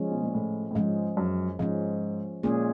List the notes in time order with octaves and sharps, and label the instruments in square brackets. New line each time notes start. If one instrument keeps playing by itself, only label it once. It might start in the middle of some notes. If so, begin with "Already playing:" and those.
Already playing: [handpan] F3 G#3 C#4
[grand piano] B2
A#2
A2
A2
[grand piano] G#2 [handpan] F3 G#3 C#4
[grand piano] F#2
[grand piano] G#2 [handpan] F3 G#3 C#4
[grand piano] A#2 [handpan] G#3 C#4 F4 G#4